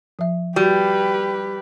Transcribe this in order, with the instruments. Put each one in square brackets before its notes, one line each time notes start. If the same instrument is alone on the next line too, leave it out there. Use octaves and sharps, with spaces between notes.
[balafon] F3 E5
[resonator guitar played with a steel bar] G3 [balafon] F#4 [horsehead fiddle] G4 B4